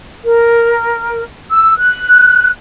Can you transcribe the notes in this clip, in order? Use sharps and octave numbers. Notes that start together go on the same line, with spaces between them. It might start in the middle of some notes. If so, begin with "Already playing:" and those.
A#4
E6
F#6